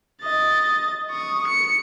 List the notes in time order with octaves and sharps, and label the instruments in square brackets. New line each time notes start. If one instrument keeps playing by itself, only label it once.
[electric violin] D#5 A6
C#6 D#6
C#7